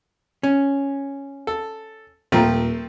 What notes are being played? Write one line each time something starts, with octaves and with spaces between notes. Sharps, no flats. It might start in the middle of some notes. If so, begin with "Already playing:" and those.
C#4
A4
D#1 F3 A3 C4 A#5